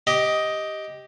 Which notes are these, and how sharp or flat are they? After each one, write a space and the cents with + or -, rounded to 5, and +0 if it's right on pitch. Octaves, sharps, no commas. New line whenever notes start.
G4 +0 D#5 +10